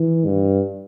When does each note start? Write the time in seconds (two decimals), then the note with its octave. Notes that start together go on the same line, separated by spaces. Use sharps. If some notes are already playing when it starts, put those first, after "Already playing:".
Already playing: E3
0.26 G2